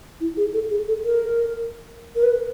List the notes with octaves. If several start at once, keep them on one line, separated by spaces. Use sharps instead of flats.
E4
G#4
A4
G#4
A4
A#4
A#4
B4